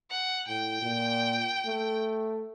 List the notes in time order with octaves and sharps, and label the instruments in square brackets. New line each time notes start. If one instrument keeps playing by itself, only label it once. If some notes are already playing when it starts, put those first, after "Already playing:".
[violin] F#5
[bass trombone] A2 [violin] G5
[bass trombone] A#2
A3